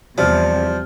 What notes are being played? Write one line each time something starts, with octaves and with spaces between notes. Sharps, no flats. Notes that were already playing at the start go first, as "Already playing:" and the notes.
E2 C3 F3 G3 D4 F6